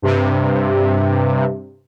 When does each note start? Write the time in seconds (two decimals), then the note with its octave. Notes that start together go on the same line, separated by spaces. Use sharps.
0.02 G2 C3